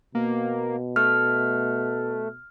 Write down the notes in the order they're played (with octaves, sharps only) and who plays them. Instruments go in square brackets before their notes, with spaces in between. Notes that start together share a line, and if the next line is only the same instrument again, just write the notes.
[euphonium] B2 [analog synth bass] A#3
[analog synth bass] A3 [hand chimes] F6